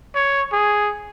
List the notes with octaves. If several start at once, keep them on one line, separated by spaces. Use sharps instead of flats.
C#5
G#4